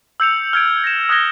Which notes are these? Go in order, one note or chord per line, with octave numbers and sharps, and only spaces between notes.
E6 G6 C#7 F7
F6 G#6 D7
A#6 E7
D#6 F6 F#6 G#6 A#6 G7